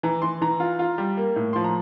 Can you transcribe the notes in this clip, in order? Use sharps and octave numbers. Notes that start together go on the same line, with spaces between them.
E3 A#5
E3 C6
E3 A#5
F4
F4
G3
A#3
A2
F3 C6
A#5